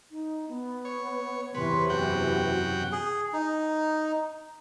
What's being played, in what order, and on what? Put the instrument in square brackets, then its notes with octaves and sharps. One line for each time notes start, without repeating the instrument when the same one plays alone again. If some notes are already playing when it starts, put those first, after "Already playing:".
[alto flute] D#4
B3
[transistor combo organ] C#5
[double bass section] E2 C3 E3 [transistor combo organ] B4 C#5 [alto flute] C6
[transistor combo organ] F#2 F#5 G5 [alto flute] F#4
[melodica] G#4
D#4